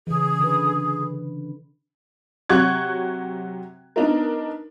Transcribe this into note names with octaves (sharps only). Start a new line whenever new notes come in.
C#3 E3 G#4
D3 B4
C3 F#3 F#5 C#6 F#6 G#6
B3 D4 D#4 A#4